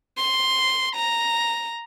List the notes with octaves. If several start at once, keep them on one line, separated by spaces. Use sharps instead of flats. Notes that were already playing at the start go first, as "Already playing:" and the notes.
C6
A#5